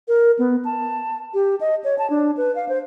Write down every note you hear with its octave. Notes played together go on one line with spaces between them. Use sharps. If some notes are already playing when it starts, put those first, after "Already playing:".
A#4
B3
A5
G4
D#5
C#5
A5
D4
B4
F5
C5